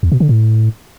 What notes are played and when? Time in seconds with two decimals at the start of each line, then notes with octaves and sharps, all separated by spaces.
0.03 E2
0.12 B2
0.20 D3
0.29 A2